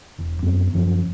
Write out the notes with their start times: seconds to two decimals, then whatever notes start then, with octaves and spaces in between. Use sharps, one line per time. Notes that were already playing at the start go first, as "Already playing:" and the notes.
0.18 E1
0.43 F#2 B3 C4
0.73 F#1 F#2 F3 C#4